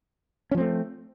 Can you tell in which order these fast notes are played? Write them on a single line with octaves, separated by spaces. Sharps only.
C#4 F3 C4 A3